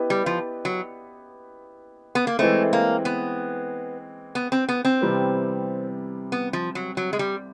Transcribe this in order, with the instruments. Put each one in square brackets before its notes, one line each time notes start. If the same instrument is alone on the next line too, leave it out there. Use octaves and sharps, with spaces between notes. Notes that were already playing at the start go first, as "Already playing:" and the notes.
Already playing: [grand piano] B3 E4 G4 B4 D#5
[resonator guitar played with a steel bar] G3
F3
F#3
B3
A#3
[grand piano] E3 G#3 C4 [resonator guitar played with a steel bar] A3
[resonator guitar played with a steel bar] A#3
B3
B3
C4
B3
C4
[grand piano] C3 E3 G3 B3
[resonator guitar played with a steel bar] B3
F3
F#3
F#3
G#3
G3